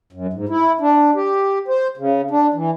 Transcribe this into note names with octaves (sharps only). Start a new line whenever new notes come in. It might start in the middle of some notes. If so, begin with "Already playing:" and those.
F#2
G#2
E4
D4
G4
C5
C#3
D4
E3